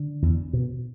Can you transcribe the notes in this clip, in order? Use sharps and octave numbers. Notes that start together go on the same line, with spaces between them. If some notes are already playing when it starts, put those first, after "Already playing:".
Already playing: D3
E2
B2